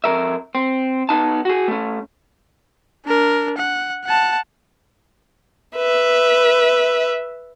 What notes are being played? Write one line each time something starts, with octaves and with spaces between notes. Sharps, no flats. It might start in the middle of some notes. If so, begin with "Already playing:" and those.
F2 A#4 E5
C4
B3 D#4 A5
F#4 G#4
A3 C#4
D4 A#4
F#5
F#5 A5
B4 E5